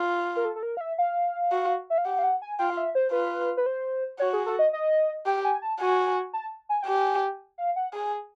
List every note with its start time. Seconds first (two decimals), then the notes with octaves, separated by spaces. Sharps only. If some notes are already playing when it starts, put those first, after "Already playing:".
Already playing: F4
0.36 A#4
0.45 A4
0.56 A4
0.63 A#4
0.77 F5
0.81 E5
0.98 F5
1.52 F#4
1.90 E5
1.98 F5
2.05 G4 F#5
2.19 F5
2.23 F#5
2.42 G#5
2.59 F4 G5
2.70 F5
2.77 E5
2.95 C5
3.12 F4 B4
3.57 B4
3.66 C5
4.20 F#4 C#5
4.33 G#4
4.46 A4
4.59 D#5
4.73 D#5
5.26 G4 G5
5.45 G#5
5.62 A5
5.80 F#4 G#5
6.33 A5
6.69 G#5
6.83 G5
6.86 G4 G#5
7.58 F5
7.76 F#5
7.93 G#4 G#5